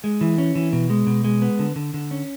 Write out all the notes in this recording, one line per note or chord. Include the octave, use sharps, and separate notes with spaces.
G#3
E3
C#4
E3
B2
G#3
B2
G#3
B3
D3
D3
D3
C#4